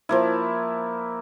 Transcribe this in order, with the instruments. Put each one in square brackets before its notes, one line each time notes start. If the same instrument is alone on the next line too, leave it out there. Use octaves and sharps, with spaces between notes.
[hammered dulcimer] F3 A#3 E4